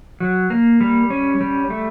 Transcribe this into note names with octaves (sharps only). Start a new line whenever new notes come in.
F#3
A#3
G3
C#4
G3
A3